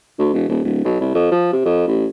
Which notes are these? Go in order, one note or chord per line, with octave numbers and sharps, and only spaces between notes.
D2
E1
D#1
D1
B1
C2
F2
F3
C3
F2
A1